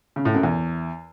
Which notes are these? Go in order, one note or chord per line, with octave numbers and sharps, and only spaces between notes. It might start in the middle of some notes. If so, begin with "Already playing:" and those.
C#3
A2
F#2
E2